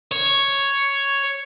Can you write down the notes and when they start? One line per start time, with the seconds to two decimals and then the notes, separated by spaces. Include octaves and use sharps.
0.12 C#5